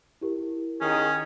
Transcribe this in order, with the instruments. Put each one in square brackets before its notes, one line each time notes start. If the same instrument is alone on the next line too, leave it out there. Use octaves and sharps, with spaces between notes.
[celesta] E4 G4 A#4
[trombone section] D#3 G#4 [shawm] C#4